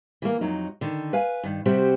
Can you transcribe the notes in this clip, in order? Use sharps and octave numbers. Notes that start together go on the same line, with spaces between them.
E3 G#3 A#3
F2 F#3 D#4
D3 D#3
B4 F5 G#5
G2 D#3
C3 G3 C4 F#4 G4 C5